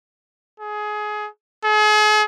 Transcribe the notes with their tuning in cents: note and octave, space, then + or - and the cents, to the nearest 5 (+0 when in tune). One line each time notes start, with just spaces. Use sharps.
G#4 +20
G#4 +40